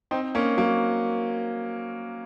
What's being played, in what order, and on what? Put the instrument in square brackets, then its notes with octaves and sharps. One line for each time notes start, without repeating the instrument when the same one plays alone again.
[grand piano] C4 D#4
A#3 C#4
F#3 A#3